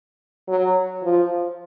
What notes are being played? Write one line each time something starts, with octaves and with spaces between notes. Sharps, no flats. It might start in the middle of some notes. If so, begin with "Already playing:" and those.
F#3
F3